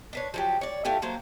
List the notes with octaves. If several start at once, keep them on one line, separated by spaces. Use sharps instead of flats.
D4 B4 C#5
F3 F#3 G4
C#5 D5
A3 E4 F4 G4
D3 F#3 A#3 C5